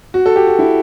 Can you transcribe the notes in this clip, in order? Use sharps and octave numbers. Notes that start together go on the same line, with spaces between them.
F#4
A4
G4
F#4
E4